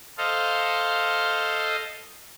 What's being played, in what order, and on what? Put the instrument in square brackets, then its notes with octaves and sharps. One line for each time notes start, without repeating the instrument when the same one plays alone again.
[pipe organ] A4 C5 D#5 F5